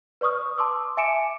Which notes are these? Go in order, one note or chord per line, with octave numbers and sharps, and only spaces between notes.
B4 D5 C#6 D#6 F6
A5 C6 D6 E6
E5 G#5 D6 C#7 D7 E7